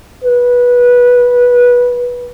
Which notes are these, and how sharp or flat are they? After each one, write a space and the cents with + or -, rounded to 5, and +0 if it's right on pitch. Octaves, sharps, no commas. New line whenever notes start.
B4 -15